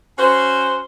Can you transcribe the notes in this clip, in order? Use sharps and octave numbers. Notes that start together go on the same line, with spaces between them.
C#4 F#4 C5